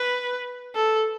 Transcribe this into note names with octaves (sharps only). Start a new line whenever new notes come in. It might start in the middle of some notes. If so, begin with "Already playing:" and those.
Already playing: B4
A4